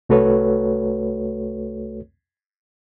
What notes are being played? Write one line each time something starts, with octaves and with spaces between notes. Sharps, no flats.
C2 A3 F#4 A4 B4 C#5